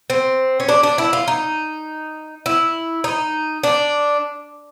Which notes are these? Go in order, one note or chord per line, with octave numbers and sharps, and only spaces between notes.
C4
C#4
D4
D4
E4
F4
D#4
E4
D#4
D4